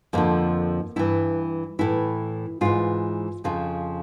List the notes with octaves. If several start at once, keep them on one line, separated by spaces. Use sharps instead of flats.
F2 D3 F3 A#3
G2 E3 E4
A2 E3 E4
G#2 E3 F4
F2 C#3 F3 F4